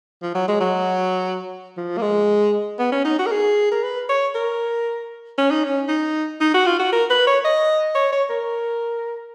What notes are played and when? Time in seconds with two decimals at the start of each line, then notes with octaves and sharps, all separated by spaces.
0.22 F3
0.35 F#3
0.48 G#3
0.61 F#3
1.77 F3
1.98 A#3
2.02 G#3
2.79 B3
2.92 C#4
3.05 D#4
3.19 F#4
3.26 A#4
3.31 G#4
3.72 A#4
3.83 B4
4.09 C#5
4.35 A#4
5.38 C#4
5.51 D#4
5.64 C#4
5.89 D#4
6.41 D#4
6.54 F#4
6.66 F4
6.80 F#4
6.93 A#4
7.10 B4
7.27 C#5
7.45 D#5
7.95 C#5
8.12 C#5
8.30 A#4